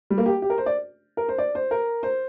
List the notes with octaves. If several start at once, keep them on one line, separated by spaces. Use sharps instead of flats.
G3
A#3
G4
G4
A#4
C5
D5
A#4
C5
D5
C5
A#4
C5